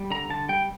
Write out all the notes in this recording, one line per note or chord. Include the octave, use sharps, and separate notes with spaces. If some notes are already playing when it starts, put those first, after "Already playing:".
Already playing: G3
D3 A#5
D3 A5
G3 G5